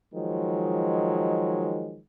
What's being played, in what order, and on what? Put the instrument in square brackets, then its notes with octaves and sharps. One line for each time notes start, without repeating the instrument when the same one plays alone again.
[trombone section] D#3 F3 F#3 G#3